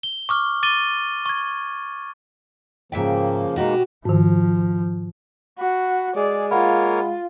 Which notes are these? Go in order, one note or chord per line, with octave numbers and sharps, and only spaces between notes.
G7
C#6 D6 F6
D6 A6 D#7 G7
C#6 G#6
G#2 C#3 F3 A#3 E5 G5
B2 G#3 A#3 D#4 F#4 G4
G#2 D#3 F3
F#4 B5
G#3 G#4 D5
A#3 F4 A#4 C#5 F#5 B5